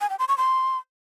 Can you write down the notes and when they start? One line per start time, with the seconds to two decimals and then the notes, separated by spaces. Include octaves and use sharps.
0.01 G#5
0.10 G5
0.19 C6
0.28 C#6
0.38 C6